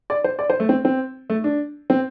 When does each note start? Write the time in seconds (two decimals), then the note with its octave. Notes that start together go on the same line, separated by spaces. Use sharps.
0.10 D5
0.24 C5
0.39 D5
0.50 C5
0.60 A3
0.69 C4
0.85 C4
1.30 A3
1.44 D4
1.90 C4